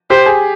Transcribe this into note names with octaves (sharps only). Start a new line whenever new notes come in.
G4 C5
G#4